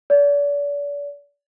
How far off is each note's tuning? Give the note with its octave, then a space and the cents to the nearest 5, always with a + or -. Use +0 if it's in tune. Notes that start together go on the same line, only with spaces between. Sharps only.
D5 -40